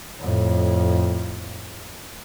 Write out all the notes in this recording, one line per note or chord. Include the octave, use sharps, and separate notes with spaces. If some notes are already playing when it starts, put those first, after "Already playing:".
F2 A2